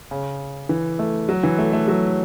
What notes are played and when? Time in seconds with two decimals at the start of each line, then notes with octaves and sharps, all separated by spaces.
0.11 C#3
0.69 E3
0.99 A3
1.29 F#3
1.43 E3
1.58 A3
1.73 A3
1.88 F#3